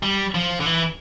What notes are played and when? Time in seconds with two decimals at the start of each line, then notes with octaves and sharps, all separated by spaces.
0.03 G3
0.35 F3
0.60 D3
0.66 E3